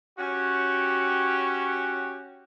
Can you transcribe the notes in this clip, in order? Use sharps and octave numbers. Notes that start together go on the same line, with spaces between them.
C#4 F#4 G4